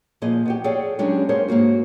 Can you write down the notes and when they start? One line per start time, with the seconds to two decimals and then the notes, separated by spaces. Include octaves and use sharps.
0.22 A#2 F3 G#4 B4 D#5
0.46 B3 F#4 G4
0.64 G#4 A4 C#5 D5 F5 G5
0.99 F#3 G#3 C#4 D4 G4 D#5
1.29 G4 G#4 A#4 C5 C#5 F5
1.48 G#2 F3 A#3 F#4